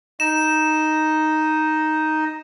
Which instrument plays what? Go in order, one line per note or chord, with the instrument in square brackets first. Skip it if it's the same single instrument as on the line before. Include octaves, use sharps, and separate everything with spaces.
[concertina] D#4 D#5 [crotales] E7